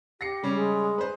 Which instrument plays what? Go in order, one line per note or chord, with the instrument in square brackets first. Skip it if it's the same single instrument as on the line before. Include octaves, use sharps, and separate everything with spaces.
[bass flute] G4 [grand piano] A#6 C7 C#7
[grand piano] C#3 G3 C#4
[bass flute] G#3
[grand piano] B4 C5